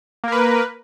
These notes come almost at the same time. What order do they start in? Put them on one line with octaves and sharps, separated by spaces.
A#3 A#4 B4